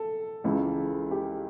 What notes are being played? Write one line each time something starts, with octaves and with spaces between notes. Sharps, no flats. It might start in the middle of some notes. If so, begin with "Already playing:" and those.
Already playing: A4
C#2 C#3 E3
G4